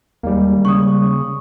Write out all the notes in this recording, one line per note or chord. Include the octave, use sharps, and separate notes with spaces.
D#2 G3 G#3 A#3
C#3 C#6 D#6